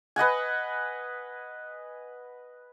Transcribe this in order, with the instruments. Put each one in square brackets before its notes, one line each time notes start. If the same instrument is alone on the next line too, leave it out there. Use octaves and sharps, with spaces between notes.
[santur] B4 D#5 F#5 G#5